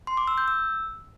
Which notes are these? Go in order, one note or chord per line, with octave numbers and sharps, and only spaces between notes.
C6
D6
E6
G6
E6